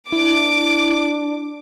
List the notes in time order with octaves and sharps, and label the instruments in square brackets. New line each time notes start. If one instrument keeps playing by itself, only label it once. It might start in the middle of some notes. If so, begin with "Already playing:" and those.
[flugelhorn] D4 [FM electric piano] E4 [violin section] D6